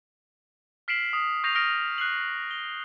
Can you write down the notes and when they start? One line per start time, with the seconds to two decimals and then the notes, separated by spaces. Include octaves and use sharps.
0.88 F6 B6 C7 D7 E7 F#7
1.13 D#6
1.44 C#6 G6 A#6 C7 F7
1.55 D#6 F6 A#6 D7
1.98 F#6 C7 F#7
2.51 G7